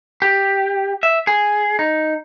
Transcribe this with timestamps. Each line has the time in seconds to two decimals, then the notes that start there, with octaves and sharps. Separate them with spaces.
0.22 G4
1.03 E5
1.27 G#4
1.79 D#4